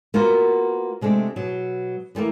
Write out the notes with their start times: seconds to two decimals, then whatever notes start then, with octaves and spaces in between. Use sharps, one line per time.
0.14 A#3 B3 F4 F#4 A#4
1.01 C3 G#3 A3 D4
1.36 B2 F#3
2.15 E3 G3 A3 A#3